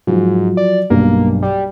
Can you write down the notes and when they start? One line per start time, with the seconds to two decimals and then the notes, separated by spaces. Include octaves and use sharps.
0.07 G#2 F3 F#3
0.57 D5
0.90 B1 G2 A#3
1.42 G3